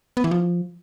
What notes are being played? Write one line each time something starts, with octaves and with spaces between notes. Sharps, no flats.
B3
E3
F3